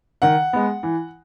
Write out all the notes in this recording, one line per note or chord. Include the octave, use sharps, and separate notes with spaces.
D#3 F#5
G#3 B3
E3